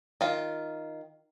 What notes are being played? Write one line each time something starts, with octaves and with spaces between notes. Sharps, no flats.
D#3 F4